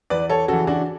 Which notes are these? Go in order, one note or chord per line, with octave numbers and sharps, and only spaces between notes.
E2 B4 D5
A4 C#5
C#3 E3 F#4 A4
D4 F#4